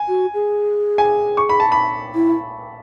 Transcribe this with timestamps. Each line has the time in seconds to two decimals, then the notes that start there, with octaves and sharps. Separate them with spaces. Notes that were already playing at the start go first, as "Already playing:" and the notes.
Already playing: G#5
0.08 F#4
0.34 G#4
0.98 G#5
1.37 C#6
1.49 B5
1.60 A5
1.72 B5
2.15 E4